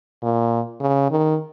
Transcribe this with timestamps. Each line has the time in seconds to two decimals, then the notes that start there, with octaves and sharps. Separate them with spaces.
0.22 A#2
0.80 C#3
1.11 D#3